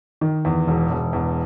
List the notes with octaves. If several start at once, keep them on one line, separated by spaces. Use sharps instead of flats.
D#3
E2
E1
E1
E2